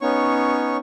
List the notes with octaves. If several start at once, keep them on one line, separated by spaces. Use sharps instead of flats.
B3 C#4 D#4 C#5 C#6